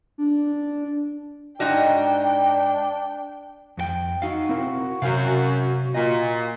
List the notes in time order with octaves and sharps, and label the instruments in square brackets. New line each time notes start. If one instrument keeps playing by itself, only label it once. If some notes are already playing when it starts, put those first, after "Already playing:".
[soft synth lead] D4
[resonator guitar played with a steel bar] G#2 D#4 F#4 [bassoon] D4 [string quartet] G5
[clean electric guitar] F2 F#4 G5
[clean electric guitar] D#4 F5 [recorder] F#4
[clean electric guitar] C4 E4 A#4
[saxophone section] F#2 [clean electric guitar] C3 F5
[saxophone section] A#2 [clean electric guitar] D#5